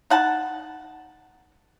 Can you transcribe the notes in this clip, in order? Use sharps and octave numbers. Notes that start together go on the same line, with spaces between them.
D#4 F#5 A5